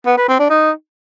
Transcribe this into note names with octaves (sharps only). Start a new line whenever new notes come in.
B3
B4
C4
D4
D#4